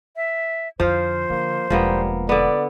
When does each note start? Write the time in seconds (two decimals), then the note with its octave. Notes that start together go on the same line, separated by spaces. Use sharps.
0.16 E5
0.80 F2 D3 F3 C5 F5
1.30 D3 A#3
1.70 E1 F3 G3 A#3 B3
2.29 D3 B3 D5